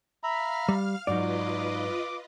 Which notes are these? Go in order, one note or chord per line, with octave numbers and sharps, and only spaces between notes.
E5 F5 A#5 B5 F6
G3
G#2 F#3 D#4 F4 B4 D5 D#5 D6